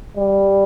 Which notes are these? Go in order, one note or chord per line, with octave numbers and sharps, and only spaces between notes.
G3